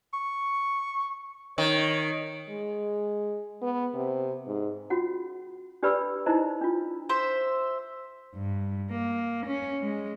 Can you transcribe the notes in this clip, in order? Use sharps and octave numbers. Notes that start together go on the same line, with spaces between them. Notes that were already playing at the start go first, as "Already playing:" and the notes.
C#6
D#3 C#5
G#3
B3
C3
G#2
C#4 F4 F#4 F#5
D4 G4 B4 D5 B5 E6
D#4 E4 C5 D#5 A#5
D4 F4
C5 E5
G2
A#3
C#4
G#3